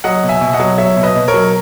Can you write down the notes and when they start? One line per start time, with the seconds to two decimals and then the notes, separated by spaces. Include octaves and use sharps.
0.04 F#3 D#5 F#5
0.23 B2
0.29 E5 G#5
0.41 B2
0.53 D#5 F#5
0.59 F#3
0.78 F#3 C#5 E5
0.97 B2
1.03 B4 D#5
1.15 B2
1.28 A#4 C#5
1.34 F#3